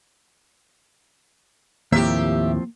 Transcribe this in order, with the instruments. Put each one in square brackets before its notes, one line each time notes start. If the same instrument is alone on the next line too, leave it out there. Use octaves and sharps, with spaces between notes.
[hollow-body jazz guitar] D#2 A2 [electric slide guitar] F3 C4 [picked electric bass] A#3 [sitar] G4 E5